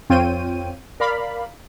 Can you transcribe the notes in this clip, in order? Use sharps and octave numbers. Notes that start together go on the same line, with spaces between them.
F2 C4 F4 C#5 G5 D#7
A#4 D5 F5 B5